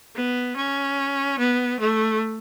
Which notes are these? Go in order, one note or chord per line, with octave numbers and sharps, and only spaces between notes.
B3
C#4
B3
A3